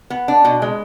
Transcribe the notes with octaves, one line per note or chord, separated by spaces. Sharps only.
B3
D4
B2
G#3